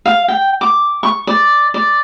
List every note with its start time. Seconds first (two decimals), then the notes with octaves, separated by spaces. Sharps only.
0.06 F5
0.28 G5
0.61 D6
1.03 C#6
1.27 D5
1.74 D5